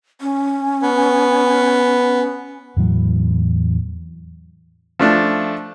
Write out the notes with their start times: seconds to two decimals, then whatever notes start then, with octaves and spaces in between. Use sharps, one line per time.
0.21 C#4
0.83 B3
2.76 E2 A2 E3 F#3
4.99 F3 A3 D4